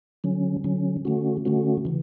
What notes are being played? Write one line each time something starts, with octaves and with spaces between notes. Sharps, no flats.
D3 F#3 C#4
D3 F#3 C#4
D3 A3 C#4 F#4
D3 A3 C#4 F#4
C#3 E3